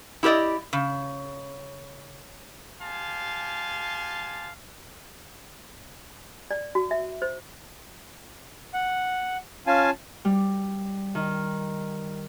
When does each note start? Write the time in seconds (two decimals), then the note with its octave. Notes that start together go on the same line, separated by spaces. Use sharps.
0.23 E4 G4 A#4 D5 D#5
0.73 C#3
2.81 G4 F5 G#5 A5 C6
6.51 D5
6.75 F#4
6.91 E5
7.22 C5
8.74 F#5
9.67 C#4 F4 F5 G#5 A5
10.25 G3
11.15 D#3